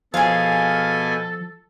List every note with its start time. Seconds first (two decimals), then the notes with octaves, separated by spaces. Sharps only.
0.14 B2 F3 G#4 A4 F5 G#5